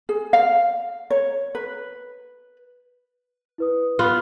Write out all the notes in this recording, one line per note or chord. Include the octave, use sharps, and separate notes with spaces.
G#4
F5
C#5
B4
E4 B4 D#6
B3 F4